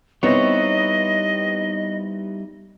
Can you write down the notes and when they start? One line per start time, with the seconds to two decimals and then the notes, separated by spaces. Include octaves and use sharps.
0.23 G3 B3 C4 D#4 E4 C#5 D#5